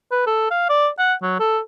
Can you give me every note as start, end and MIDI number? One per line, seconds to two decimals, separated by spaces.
0.12 0.24 71
0.27 0.46 69
0.51 0.67 77
0.70 0.88 74
0.99 1.14 78
1.22 1.35 54
1.40 1.59 69